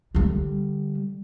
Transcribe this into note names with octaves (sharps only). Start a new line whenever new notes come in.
D3 G3